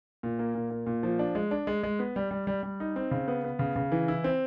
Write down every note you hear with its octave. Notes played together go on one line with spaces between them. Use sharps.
A#2
A#3
A#2
A#3
A#2
F3
D4
G#3
D4
G#3
G#3
B3
G3
G3
G3
G3
D#4
C4
C#3
B3
B3
C#3
C#3
E3
E4
C4